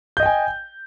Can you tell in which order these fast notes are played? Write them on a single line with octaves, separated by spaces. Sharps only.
G6 D#5 G5 G#5